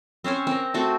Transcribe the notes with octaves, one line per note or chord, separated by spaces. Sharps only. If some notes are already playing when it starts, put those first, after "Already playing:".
C4 C#4 C5 C#5
C4 A#4
A3 C4 F#4